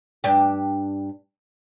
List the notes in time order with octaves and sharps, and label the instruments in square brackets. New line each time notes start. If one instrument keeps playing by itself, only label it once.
[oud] G2 D4 G4